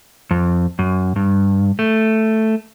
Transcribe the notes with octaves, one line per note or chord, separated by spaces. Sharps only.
F2
F#2
G2
A3